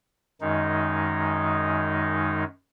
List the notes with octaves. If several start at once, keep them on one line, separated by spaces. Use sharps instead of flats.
F#2 D#3 G#3 D#4